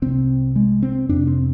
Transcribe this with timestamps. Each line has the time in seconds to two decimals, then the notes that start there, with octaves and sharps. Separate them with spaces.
0.02 C2 C3 C4
0.56 G#3
0.82 C4
1.09 F2 C3 D4
1.27 C4